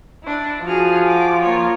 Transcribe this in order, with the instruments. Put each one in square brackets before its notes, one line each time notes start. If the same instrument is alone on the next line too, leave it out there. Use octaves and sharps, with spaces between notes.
[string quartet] D4 E4
[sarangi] F3 [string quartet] F#4 G#4 F6
[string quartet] F#4 D6
A#3 F4 C#5